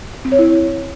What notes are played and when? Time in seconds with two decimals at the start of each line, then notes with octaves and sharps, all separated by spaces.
0.25 C4
0.32 C#5
0.39 E4